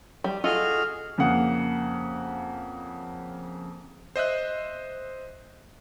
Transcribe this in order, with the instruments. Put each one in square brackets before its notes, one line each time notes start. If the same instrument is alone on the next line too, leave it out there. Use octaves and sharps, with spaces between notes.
[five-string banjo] G3
[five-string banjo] F4 A4 D#5 [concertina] F#4 G#4 [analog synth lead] F6
[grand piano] F2 C#3 A#3 F#5
[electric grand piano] C5 D#5 E5 F#6